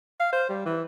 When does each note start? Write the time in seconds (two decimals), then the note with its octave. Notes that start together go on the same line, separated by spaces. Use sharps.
0.20 F5
0.33 C5
0.49 G3
0.66 E3